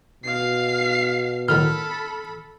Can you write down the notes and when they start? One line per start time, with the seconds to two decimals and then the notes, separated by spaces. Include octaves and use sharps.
0.24 B2 F5 C7
1.49 A2 D#3 F#3 A4 B5 F6